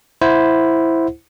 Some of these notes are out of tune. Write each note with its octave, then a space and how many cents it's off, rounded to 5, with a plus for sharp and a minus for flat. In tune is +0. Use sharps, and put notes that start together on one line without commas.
E4 +0 C5 +0 F#5 +0